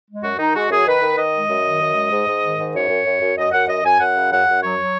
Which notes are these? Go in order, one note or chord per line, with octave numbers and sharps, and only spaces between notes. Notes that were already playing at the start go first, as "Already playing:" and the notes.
G#3
F#2 F#4
D#3 D#4
G#3 F#4
F#2 G#4
D#3 B4
D#3
D#3 D#5
G#3
F#2
D#3
F#2
G#3
G#2
G#2
D#3
G#2
F#2 C#5
F#2
F#2
F#2
F#2 D#5
F#2 F#5
F#2 D#5
F#2 G#5
F#2 F#5
C#3
F#2 F#5
F#2
F#3 C#5
F#3